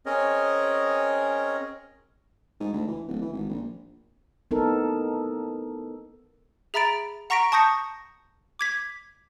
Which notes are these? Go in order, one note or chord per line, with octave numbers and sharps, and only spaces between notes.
C4 C#4 G#4 A#4 C#5 D#5
G#2
D2
E3
D1
E3
G#1
A#1
B3 C4 D#4 E4 A4 A#4
G#4 E5 A#5 B5 A6 D7
F#5 A#5 C#6 A#6 B6 D7
A5 C#6 D#6 G6 A#6 C#7
D6 G#6 B6